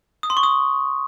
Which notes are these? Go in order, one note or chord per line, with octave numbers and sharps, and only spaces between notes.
D#6
C6
C#6
D#6